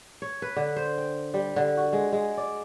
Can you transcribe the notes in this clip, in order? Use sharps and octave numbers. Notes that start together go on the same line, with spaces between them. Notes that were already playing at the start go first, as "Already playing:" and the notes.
C#5
B4
D3
C5
G5
G3
D3
F#4
G#3
G#3
D5